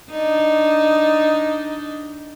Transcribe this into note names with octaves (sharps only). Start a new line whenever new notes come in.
D4 D#4